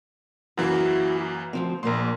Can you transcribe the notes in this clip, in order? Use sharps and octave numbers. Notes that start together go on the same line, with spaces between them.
F#2 E3 A#3 E4 F#4
D2 F3 C4
A#1 A#2 A#3 C6